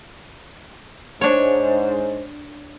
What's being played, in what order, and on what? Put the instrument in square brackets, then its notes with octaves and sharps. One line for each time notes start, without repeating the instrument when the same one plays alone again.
[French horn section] G#2 C5 [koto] D4 C#5